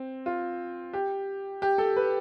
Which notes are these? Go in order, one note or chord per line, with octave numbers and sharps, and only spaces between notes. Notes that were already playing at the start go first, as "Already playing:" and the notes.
Already playing: C4
F4
G4
G4
A4
B4